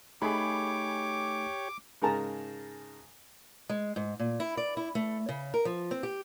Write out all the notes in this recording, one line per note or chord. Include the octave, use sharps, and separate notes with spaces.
A3 D#4 G4 G#4 C#5 B5 D6
G#2 C#3 A#4 A5 A#5
G#3
G#2
A#2
E4
D5
E4
A3
C#3
A#4
F3
C4
G4